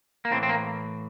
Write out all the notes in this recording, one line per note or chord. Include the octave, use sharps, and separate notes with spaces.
A#3
A2 E3 C4
C4
A#3